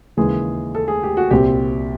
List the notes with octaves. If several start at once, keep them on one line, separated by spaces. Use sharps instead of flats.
D#2 C#3 E3 G#3 G#4
A4
G#4
G4
F#4
C2 A#2 G3 C4 G4